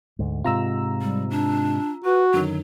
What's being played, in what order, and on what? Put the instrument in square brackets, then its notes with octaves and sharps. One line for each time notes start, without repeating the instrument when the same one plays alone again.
[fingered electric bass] D2 G#2
[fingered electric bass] G#2 C3 [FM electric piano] F4 A#5 E6
[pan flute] G3
D4
[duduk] F#4 [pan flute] B4
[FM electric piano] F#2 D3 D#3 [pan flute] F#3